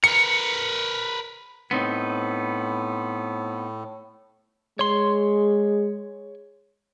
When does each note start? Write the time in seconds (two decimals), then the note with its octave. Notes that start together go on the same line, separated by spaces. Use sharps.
0.04 A#4 B4 C#7
1.71 A2 B3 C4 D#4
4.79 G#3 C#5 C6